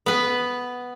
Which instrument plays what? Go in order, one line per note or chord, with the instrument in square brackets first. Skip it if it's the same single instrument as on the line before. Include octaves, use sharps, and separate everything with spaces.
[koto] B3 B4